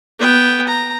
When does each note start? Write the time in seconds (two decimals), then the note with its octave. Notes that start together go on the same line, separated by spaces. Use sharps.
0.19 B3 G5
0.67 A#5